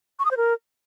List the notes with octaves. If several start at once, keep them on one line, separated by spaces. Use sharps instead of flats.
C#6
D#6
C5
A#4